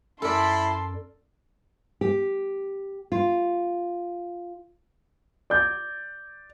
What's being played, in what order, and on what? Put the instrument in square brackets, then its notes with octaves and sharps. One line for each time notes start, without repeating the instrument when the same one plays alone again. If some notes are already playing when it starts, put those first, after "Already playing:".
[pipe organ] F#2 [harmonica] E4 B5 [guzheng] A4 A#4 D5 [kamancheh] A5 C6
[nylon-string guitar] G4
F4
[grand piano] D5 G6